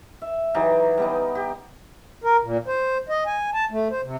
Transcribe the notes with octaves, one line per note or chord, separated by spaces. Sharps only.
E5
E3 F#3 D#4 G4
G3 B3 D#4
G4
A#4
A#2
C5
D#5
G#5
A5
A3
C5
C3